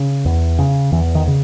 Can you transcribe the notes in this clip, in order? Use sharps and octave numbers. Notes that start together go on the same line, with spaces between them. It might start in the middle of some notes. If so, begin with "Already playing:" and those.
Already playing: C#3
E2
C#3
E2 E3
D#3
C#3